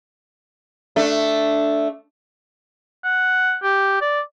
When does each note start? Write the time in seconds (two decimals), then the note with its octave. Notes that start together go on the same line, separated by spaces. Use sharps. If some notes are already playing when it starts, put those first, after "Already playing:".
0.96 A3 D4
3.04 F#5
3.63 G4
4.01 D5